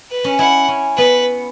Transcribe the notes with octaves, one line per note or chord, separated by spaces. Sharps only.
B4
C#4
E4 F#5
C#4
B3 B4